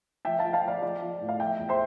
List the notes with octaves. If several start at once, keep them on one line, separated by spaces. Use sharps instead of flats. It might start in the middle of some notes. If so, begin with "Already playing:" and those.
F3 E5 G5
F5 A5
F3
F5 A5
F3 D5 F5
F3 D5 F5
F3
A2
F5
F3 E5 G5
E2
C5 E5